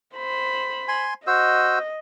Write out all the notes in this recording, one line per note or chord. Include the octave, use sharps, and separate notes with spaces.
C5 B5
G#5 C6
F#4 C5 D#5 E6